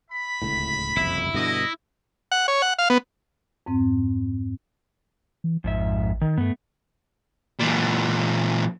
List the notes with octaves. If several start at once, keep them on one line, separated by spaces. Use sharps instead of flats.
E5 B5
D1 C#2 A2
F#1 C2 F2 E4
G2 B2 D3 D#5
F#5
C#5
F#5
F5
B3
F2 G#2 C4
E3
A1 F2 G#2 E5
D#3
G2 A3 B3
A#2 E3